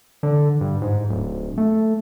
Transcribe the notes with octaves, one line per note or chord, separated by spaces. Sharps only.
D3
G2
G#2
D1
A3